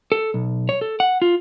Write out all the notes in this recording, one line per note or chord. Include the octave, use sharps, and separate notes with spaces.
A4
B1
C#5
A4
F#5
F4